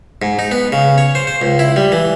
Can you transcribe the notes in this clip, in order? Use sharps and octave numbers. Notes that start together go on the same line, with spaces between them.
G#2
D#4
B3
C#3
C#5
C5
C5
C#2
E4
G3
E3